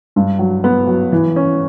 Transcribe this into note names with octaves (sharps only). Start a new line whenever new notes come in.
G2
F#3
B3
F#3
E3
C#4